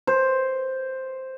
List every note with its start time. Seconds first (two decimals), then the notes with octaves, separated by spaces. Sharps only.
0.07 C5